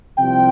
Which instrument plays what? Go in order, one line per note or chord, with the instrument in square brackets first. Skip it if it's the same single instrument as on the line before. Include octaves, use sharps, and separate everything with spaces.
[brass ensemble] C2 C3 F3 G5